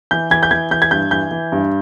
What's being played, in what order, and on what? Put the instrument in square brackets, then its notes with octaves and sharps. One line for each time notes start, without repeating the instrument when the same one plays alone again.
[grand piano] E3 G6
E3 G#6
G6
E3 G#6
E3 G6
G#6
G2 G6
E3 G6
E3
G2